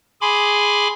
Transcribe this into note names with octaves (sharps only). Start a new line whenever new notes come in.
G#4 G#5 B5 C6 D6